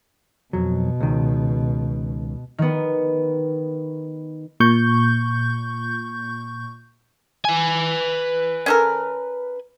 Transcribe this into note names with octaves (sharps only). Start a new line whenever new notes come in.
F2 B2 F#3
C#2 D#3
D#3 B3
A#2 C#6 G6
B4 G#5
C#4 A4 A#4